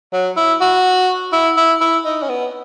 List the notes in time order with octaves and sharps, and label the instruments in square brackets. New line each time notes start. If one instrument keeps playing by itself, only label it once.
[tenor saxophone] F#3
E4
F#4
E4
E4
E4
D#4
C#4
B3